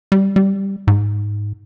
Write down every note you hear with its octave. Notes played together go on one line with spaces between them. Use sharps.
G3
G3
G#2